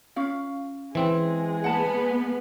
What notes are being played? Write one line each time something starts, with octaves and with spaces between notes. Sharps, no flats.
C#4 F4 F5
E3 G#3 C4 G#4
B3 F#5 A5